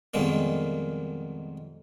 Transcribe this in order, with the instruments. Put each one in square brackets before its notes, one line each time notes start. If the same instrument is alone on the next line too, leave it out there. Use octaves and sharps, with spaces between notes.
[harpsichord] F2 B2 D#3 G3 G#3 A#3